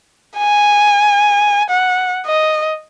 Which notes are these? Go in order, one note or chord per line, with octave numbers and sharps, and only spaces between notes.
G#5
F#5
D#5